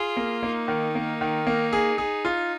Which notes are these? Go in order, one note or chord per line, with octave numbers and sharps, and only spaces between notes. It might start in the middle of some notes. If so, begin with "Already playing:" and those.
Already playing: F4 G#4
A#3
A#3 D#4
D#3
A#3
D#3
A#3
G#4
G#4
F4